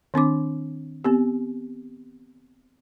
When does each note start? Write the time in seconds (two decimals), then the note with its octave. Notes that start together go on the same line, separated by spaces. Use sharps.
0.14 D#3 C4 D4 D6
1.05 B3 C4 G4